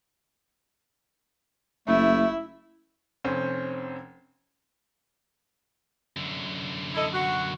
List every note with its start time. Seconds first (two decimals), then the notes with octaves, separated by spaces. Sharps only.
1.88 F#1 A3 E4
3.24 F1 C4 C#4 C5
6.17 F#2 D3
6.94 E4 A4 D#5
7.12 F#4